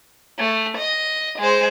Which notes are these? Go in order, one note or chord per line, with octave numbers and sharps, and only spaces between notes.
A3
D#5
G#3 C5